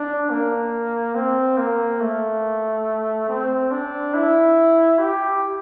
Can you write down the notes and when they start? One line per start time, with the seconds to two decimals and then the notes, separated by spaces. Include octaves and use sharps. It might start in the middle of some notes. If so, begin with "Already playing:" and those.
Already playing: D4
0.30 A#3
1.15 C4
1.57 A#3
2.00 A3
3.29 C4
3.71 D4
4.14 E4
4.99 G4